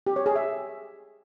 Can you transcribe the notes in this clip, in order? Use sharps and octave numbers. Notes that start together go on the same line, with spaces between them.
G4
C#5
G#4
E5